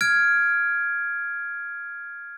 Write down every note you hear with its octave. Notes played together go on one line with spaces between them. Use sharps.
F6 G#6 D7